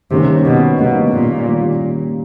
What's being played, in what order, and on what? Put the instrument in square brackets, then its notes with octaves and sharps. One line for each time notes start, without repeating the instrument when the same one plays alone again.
[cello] C3 [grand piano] D#3 G3 A#3 C#4
[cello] B2
[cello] B2 [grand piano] D#3 G3 A#3 C#4
[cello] A#2
[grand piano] D#3 G3 A#3 C#4